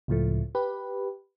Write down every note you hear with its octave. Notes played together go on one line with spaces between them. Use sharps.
C#2 A2 F3 A3
G4 B4